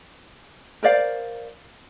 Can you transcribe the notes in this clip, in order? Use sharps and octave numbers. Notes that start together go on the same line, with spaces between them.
A#4 C5 D5 F5